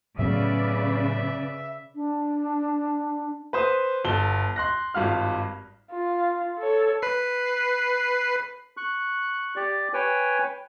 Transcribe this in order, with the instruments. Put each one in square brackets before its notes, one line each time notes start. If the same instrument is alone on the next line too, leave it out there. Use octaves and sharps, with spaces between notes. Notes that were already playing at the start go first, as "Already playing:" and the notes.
[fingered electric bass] A2 F#3 B3 [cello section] C#3 B4 D5 [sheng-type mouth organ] E5
[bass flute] D4
[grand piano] B4 C5 D#6
G1 A5 G7
C6 F#6 A#6
G#1 G2 F4 F6
[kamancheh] F4
A4 C#5
[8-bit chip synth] B4 C7
[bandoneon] C#6 F#6
G4 D5
B4 C#5 G5 G#5